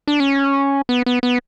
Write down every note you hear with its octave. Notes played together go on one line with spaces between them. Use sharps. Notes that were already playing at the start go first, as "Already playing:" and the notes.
D4
C#4
B3
B3
B3